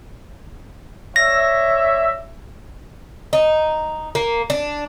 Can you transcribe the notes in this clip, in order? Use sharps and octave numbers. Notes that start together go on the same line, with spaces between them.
C#5 D5 E5 A#6
D#4
A#3
D4